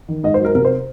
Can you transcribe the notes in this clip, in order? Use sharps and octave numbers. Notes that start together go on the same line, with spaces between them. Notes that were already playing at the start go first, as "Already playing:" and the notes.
D#3
G#2 D#5
C5
F#3
A#4
C3 A#4
C5